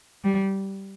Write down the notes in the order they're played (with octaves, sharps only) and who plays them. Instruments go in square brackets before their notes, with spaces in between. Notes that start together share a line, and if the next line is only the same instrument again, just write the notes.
[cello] G3